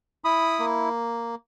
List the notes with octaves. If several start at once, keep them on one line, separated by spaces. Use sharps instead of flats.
E4 B5 D#6
A#3